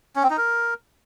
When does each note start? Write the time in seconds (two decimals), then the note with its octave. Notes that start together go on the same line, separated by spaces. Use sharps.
0.16 C#4
0.23 C4
0.30 D#4
0.37 A#4